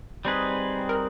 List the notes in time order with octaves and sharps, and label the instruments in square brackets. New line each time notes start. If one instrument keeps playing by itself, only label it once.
[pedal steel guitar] G3 C4 D#4 G#4 B4
[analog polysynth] A#4